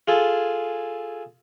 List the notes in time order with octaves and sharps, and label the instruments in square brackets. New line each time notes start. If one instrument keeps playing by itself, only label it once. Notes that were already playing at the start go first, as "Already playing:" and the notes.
[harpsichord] F4 G#4 A4